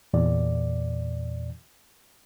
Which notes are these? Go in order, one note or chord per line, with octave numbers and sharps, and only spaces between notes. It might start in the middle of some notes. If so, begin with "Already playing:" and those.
E2 A#2 D5